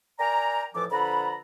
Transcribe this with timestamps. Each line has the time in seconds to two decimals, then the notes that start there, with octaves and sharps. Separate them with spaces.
0.19 A#4 D5 G5 G#5 A#5
0.75 F2 A2 E3 F3 A4 D6
0.91 D3 F3 A4 B4 A#5 B5